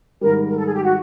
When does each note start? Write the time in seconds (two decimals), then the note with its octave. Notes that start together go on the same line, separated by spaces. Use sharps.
0.21 G#2 D#3 G3 A#4
0.48 A#4
0.57 A4
0.66 G#4
0.74 G4
0.83 F#4